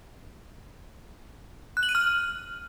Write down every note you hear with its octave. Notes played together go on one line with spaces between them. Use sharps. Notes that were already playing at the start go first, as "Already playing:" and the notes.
F#6
F#7
D#7
F6